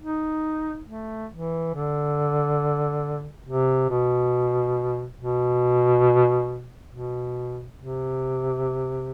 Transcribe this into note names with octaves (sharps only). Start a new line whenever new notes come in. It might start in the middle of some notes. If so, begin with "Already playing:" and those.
D#4
A3
E3
D3
C3
B2
B2
B2
C3